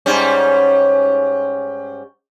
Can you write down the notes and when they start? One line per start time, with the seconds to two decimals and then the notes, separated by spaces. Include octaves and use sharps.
0.06 G#2 G3 C#4